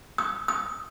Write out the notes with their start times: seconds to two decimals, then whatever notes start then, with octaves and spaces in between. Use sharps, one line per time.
0.18 D#6
0.48 D#6